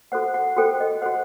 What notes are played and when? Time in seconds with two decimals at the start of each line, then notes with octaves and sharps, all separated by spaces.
0.12 F#4 A4 C5 F#5
0.34 F#5
0.57 F#4 A4 C5 G5
0.80 D#5
1.02 F#4 A4 C5 F#5